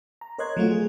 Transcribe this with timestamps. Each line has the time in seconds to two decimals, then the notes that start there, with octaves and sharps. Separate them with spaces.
0.21 A#5
0.38 A#4 C#5 D#5 C6 F#6 G#6
0.57 F3 F#3 A3 F4 F#4
0.71 G#4